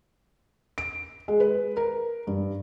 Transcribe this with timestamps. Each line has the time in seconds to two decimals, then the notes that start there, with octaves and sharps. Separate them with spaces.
0.78 D7
1.28 G#3
1.40 B4
1.77 A#4
2.27 G2